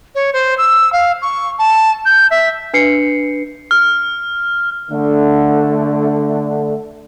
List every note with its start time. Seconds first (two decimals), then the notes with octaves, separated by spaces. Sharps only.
0.15 C#5
0.33 C5
0.58 E6
0.93 F5
1.22 C#6
1.58 A5
2.05 G6
2.31 E5
2.74 D4 B4 C7 C#7
3.71 F6
4.90 D3 A3